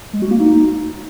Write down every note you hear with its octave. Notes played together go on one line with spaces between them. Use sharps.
G#3
F#4
A#3
D#4